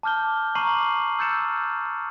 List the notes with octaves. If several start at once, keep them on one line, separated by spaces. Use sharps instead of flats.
A5 D6 F6 G6 G7
A#5 C#6 D6 C7 D#7 F#7
E6 F6 G6 A6 C#7 E7